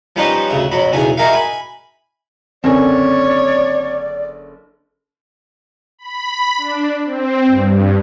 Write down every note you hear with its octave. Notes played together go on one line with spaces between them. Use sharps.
F3 G3 C#4 D#4 B4 C5
D2 C#3 E5
F2 F#3 B5
B1 E2 C#3 G#4 G#5
D#4 F#4 G#4 A#4 E5 F5
G#5 B5
F#1 D3 C4 C#5 D5 G#5
B5
D4
C4
G2